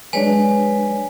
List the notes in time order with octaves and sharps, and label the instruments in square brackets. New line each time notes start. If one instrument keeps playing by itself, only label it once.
[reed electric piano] F#3 G#3 D4 [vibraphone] B4 C#5 D5 [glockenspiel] G#5